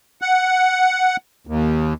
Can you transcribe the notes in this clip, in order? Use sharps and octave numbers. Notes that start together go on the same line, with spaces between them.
F#5
D#2